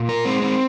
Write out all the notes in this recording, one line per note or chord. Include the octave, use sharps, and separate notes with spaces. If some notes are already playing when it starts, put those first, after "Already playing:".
Already playing: A#2
A#4
G#3 C4
C4